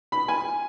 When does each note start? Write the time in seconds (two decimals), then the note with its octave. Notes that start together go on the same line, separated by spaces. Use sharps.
0.12 B5
0.28 G#5